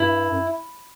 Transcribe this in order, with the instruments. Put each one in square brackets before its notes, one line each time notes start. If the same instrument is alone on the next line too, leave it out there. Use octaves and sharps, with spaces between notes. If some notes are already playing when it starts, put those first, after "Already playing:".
Already playing: [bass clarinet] G2 [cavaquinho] E4
[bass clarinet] F#2